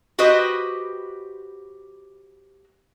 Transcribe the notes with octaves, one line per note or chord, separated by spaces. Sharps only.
F#4 G4 B4 C5 D#5